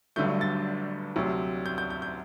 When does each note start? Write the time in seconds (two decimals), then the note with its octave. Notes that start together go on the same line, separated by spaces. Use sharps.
0.16 G1 G2 D3 F#3 A3 G6
0.41 A6
1.16 D2 C3 F#3
1.66 G6
1.78 G6
1.90 G6
2.02 G6